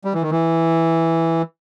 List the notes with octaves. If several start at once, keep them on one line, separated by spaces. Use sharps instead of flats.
G3
E3
D#3
E3